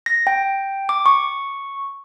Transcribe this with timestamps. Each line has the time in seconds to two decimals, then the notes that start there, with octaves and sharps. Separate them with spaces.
0.06 A#6
0.27 G5
0.89 D6
1.06 C#6